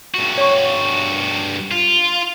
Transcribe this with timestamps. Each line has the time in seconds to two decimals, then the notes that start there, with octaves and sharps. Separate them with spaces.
0.14 G2 F#4
0.38 C#5 C#6
1.71 F4